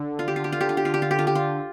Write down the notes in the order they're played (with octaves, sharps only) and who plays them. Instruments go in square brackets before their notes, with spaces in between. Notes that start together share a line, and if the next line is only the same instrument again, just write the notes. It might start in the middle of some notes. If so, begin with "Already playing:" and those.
Already playing: [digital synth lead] D3
[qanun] F4
G4
F4
G4
F4
G4
F4
G4
F4
G4
F4
G4
F4
G4
F4